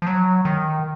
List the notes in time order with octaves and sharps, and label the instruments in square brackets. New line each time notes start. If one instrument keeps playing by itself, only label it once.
[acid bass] F3
F#3
D#3